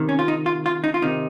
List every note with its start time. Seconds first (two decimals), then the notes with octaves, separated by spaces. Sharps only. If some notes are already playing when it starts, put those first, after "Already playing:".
Already playing: C3 D#3
0.09 C#4
0.19 F4
0.28 D#4
0.46 F4
0.66 F4
0.84 D#4
0.94 F4
1.02 C3 D#3 D#4